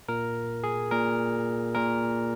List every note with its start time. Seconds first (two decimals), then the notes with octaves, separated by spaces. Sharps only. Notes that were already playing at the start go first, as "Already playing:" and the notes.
0.09 A#2 A#4
0.64 G#4
0.91 A#2 A#4
1.75 A#2 A#4